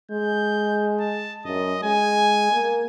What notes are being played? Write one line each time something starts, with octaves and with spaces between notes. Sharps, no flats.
G#3 G6
A5
F#2 D#5
G#3 G#5
A#3